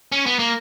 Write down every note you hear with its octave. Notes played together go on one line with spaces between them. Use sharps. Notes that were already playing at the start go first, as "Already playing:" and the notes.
C#4
B3
A#3